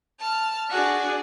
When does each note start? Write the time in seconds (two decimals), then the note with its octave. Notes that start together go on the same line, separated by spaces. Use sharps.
0.18 A5 F6
0.70 D4 F#4 G#4 D5